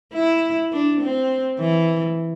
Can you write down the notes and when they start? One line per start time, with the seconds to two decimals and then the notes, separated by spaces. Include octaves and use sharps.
0.13 E4
0.72 D4
1.01 C4
1.59 E3